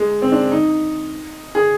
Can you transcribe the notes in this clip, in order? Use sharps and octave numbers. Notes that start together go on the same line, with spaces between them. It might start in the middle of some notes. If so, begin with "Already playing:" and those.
Already playing: G#3
C4
D4
D#4
G#4